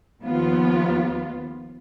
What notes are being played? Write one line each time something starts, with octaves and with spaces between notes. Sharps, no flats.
D#2 F3 B3 F4